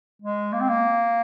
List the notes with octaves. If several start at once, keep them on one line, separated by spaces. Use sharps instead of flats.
G#3
A#3
C4
A#3